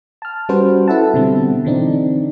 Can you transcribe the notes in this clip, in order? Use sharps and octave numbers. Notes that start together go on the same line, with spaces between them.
A5 F6
G3 C#4 F#4 B4 C5
E4 A4 E5 F#5 A5
B2 D3 G3 C4
D3 E3 C4 D4 D#4